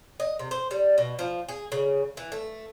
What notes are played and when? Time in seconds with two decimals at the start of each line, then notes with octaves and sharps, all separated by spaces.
0.20 D#5
0.39 C3
0.51 C5
0.71 G3
0.98 B2
1.19 F3
1.49 G#4
1.72 C#3
2.17 E3
2.32 A3